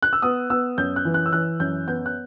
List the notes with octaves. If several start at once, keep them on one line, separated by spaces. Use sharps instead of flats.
F#6
E6
B3 D#6
B3 E6
F#2 G6
F#6
E3
F#6
E6
E3 F#6
F#2 G6
B3 G6
F#6